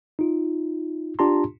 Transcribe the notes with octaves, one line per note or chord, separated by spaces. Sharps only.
D#4 F4
D4 F4 G4 A5 A#5 C6